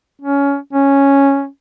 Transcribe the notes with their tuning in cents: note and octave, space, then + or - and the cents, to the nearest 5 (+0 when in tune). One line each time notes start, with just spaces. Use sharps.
C#4 +20
C#4 -5